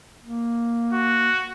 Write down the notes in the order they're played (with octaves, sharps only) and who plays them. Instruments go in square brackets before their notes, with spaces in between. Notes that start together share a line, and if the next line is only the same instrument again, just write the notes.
[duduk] A#3
[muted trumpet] F#4